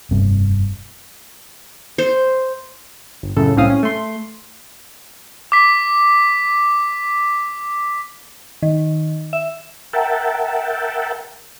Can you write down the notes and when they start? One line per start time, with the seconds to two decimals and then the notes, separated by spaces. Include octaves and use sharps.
0.11 F1 G2 C3 C4
1.98 C5
3.23 G1
3.36 F#2 A2 C#3 A4
3.56 C2 A2 C4 C#4 F5 D#6
3.70 C#4
3.83 A3 C6
5.52 D6 B6
8.62 D#3
9.33 E5
9.93 A#4 E5 F#5 G5 A5